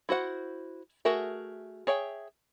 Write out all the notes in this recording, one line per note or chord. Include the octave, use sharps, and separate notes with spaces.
E4 F#4 C5 F#5
A3 F#4 G#4 A#4 E5
G#4 C#5 E5 G5